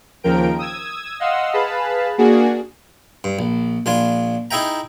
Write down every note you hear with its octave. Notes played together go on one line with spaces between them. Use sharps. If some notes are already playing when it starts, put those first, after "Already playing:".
D#2 C#3 F3 A#4 G5 D7
D#6 E6 G#6
D#5 F5 F#5 C6 D#6 E6
G#4 B4 F5 A5 B5
A#3 D4 F#4 G#4
G2
A#1
A#1 D4 F4 G#5
D#4 E4 G#4 E5 G5 A#5